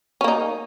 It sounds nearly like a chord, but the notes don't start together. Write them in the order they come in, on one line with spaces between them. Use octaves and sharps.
C#4 A#3 D#4